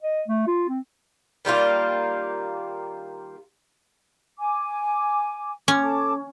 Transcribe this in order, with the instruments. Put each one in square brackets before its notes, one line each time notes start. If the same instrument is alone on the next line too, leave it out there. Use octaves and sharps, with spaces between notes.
[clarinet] D#5
A3
F4
C4
[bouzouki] D#3 G3 A#3 F4
[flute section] G#5 D6
[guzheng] C#4 [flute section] D6
[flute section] A4 A5 D6